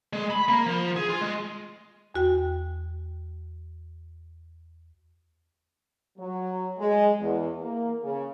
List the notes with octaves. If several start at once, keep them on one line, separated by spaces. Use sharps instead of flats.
G#3
B5
A#3
F3
G#4
F4
G#3
E2 F#4 G5
F#3
G#3
E2
A#3
C#3